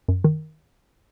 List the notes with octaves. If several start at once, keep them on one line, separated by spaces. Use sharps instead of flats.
F#2
D#3